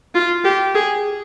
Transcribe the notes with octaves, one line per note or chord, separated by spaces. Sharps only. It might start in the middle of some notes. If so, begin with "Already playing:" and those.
F4
G4
G#4